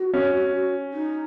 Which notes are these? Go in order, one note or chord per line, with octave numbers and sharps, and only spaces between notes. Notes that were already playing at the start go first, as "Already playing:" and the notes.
Already playing: F#4
C#4
D#4